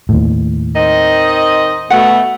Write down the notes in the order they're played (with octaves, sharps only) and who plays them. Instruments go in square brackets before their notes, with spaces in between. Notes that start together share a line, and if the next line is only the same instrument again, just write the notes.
[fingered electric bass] D#2 A2
[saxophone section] D#3 C4 D#5
[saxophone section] B2 A3 [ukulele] F#5